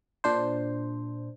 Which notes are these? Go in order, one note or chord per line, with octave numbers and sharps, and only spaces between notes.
A#2 D4 C5